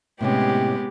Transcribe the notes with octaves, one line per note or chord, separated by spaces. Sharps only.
A2 C3 G#3 B3 C#4 G4